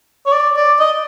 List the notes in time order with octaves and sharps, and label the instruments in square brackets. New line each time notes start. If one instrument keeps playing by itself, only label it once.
[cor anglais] C#5
D5
D5
D#5